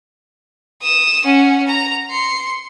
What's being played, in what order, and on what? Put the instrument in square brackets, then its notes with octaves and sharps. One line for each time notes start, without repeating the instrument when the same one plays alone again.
[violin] D#6 E7
C#4 F#5
A#5
C6 C#7